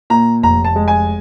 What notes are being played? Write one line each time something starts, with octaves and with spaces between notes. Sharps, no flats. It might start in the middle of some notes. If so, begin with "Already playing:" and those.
A#2 A#5
F1 A#5
A5
G#3
G#5